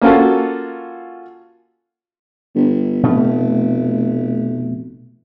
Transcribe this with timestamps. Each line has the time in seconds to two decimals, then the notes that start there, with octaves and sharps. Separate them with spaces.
0.02 A#3 C#4 F4 F#4 A4
2.55 G1
3.03 F1 B2 A3